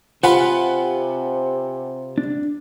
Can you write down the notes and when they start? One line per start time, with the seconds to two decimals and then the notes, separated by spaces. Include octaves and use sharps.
0.24 C3 F4 B4 C5 F#5 G#5
2.18 D4